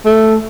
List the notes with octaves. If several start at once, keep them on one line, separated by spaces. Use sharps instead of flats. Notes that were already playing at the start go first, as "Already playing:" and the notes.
A3